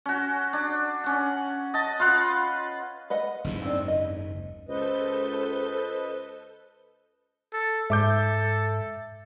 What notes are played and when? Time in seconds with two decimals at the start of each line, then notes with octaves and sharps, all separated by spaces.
0.06 C#4 F#4
0.53 D4
1.04 C#4 F#5
1.74 D#5 A5
2.00 F4 B4 F5 F#5
3.10 B4 D#5 F#5
3.44 F#1 D#2 G#2
3.62 C4 D4
3.88 D#5
4.68 C#2 A4 B4 C5 D#5 G6
7.53 A4
7.90 G#2 A4 E5 D6 G6